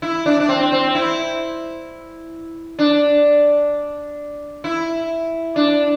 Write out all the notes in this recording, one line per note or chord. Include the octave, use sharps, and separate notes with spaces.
E4
D4
D4
C4
C4
E4
D4
E4
D4